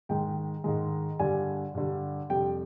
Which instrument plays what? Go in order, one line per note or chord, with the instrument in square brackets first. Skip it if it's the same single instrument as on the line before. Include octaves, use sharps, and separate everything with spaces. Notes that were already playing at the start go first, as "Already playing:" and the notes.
[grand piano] G#2 D#3 G#3 G5
G#2 D#3 G#3
G2 D3 G3 G#5
G2 D3 G3
F2 C3 G3 G5